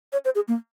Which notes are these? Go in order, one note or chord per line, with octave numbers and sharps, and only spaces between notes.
C#5
C5
G#4
A#3